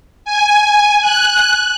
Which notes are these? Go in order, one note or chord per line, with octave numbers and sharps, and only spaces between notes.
G#5
F#6